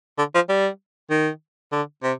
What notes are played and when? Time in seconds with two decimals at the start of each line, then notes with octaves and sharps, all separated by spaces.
0.18 D3
0.35 F3
0.49 G3
1.11 D#3
1.72 D3
2.03 C3